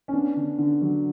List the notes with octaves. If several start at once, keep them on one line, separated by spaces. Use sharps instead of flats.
C#4
B3 D4
D3
D3
F#3